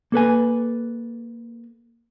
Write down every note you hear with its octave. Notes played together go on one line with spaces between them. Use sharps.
A#3 A4 B4 G#5